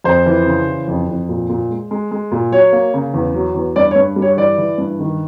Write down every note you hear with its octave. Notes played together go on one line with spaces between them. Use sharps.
F2 C5
E3
C#3
E3
F2
F2
A#2
A#2
G#3
G#3
G#3
A#2
F#3 C#5
A#3
C#3
E2
F#3
E2
G2 D5
C#5
G2
G3
C#5
E3 D5
E3
G2
D#3